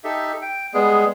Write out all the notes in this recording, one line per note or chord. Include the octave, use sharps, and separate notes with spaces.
D#4 G4 A4 E5
G5
G3 G#3 B3 G#4